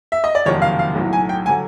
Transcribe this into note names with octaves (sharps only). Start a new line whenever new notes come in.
E5
D#5
D5
F#1 F2 C3 D#3 F#3 C#5
F5
F5
B1 A2 F#3
G#5
G5
D3 F#3 G#5